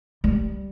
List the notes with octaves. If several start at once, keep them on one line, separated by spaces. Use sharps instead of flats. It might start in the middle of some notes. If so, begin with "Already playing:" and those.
G3